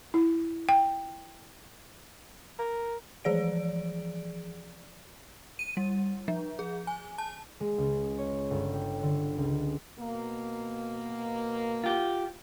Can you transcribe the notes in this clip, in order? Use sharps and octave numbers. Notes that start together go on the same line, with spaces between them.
E4
G5
A#4
E3 F3 G#4 D5 D7
D#7
G3
F3
G#4
G#5
A5
G#3
C#2
C#5
G1
G4
D3
C#2
B2 A#3
F4 G4